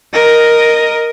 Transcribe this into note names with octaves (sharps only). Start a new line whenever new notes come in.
A#4 D#5